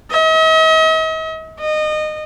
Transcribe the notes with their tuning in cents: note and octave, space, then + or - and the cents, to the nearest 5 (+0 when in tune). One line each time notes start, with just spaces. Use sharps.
D#5 +45
D#5 -25